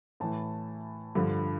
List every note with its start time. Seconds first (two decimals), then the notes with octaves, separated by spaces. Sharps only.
0.20 A2 E3 A5
1.15 G2 D3 F3